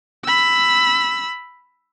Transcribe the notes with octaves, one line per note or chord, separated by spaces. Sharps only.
B5 E6